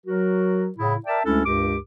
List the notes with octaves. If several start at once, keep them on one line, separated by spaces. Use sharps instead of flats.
F#3 F#4 A#4
A2 C#3 E4
A#4 D5 E5 G5 A5
D2 G#3 C#4 D4 E4 A4
C#2 G2 G4 A#4 D6